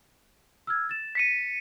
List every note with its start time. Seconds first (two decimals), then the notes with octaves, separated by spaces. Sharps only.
0.67 E6 F6 G#6
0.89 A6 E7
1.15 B6 C#7 D#7